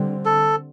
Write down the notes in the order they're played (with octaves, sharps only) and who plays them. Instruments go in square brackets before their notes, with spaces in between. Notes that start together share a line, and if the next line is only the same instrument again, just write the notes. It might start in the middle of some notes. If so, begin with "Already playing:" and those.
Already playing: [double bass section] D3 G3 C4
[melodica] A4